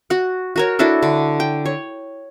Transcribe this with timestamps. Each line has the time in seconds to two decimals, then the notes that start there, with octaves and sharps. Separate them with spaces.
0.10 F#4 F#5
0.56 F#4 A#4 C#5
0.79 D4 E4 F#4 A4
1.02 D3
1.40 G5
1.65 C#5